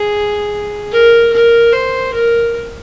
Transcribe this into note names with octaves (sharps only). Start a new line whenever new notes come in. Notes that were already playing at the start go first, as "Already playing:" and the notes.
Already playing: G#4
A#4
A#4
C5
A#4